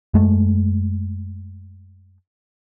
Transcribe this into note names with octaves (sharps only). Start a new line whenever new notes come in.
F#2 G#3 A3